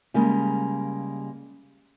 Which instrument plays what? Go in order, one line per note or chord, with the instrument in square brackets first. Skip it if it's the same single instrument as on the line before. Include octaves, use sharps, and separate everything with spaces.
[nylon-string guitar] C#3 G3 G#3 A#3